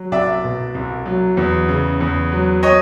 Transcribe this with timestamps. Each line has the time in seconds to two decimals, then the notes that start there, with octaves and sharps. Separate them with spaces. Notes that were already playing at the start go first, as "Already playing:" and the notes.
Already playing: F#3
0.12 C2 D5 E5
0.44 B2
0.74 C2
1.06 F#3
1.37 E2
1.69 C#3
2.01 E2
2.32 F#3
2.63 C#5 D#5